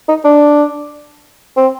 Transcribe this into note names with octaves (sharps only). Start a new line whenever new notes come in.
D#4
D4
C4